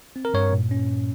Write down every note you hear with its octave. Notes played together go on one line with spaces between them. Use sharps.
C4
A#4
G2 C#5
A#2
C#4